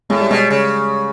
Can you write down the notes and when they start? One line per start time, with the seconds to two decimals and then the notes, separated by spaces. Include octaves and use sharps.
0.10 A2 G#3
0.20 G3
0.30 B2 G#3
0.50 C#3